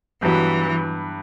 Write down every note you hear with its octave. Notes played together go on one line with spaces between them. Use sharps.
G2 E3 F#3 B3